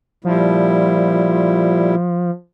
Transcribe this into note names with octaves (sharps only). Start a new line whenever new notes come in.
A#2 F3 G3 E4